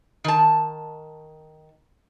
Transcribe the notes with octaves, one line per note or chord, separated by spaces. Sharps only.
D#3 A5